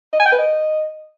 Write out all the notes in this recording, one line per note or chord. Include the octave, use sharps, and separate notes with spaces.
D#5
G#5
G5
B4
D#5